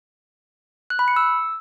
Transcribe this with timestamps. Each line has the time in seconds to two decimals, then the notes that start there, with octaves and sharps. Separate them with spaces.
0.90 F#6
0.99 B5
1.08 C#7
1.16 E6